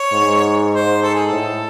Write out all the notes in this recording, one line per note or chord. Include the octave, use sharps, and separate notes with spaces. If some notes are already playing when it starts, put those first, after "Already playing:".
Already playing: C#5
G#2
C5
A4
G#4
A4
A2